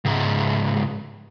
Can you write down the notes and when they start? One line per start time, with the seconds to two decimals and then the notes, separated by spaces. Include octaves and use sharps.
0.05 C#2 G#2